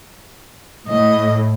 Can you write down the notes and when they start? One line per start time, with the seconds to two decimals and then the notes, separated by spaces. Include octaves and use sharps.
0.88 A2 D#5